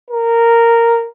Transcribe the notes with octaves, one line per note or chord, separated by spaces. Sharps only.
A#4